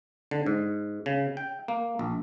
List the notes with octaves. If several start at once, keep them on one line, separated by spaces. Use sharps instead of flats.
D3
G#2
C#3
G5
A#3
A#1